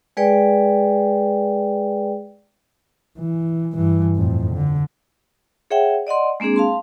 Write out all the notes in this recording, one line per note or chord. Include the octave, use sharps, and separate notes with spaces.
G#3 G#4 B4 D5 G5
E3
G2 E3
F2 A2
D3
G#4 C#5 E5 F#5 G5
D5 D#5 F#5 C6
G#3 A#3 C4 D4 G#4
F5 A5 C6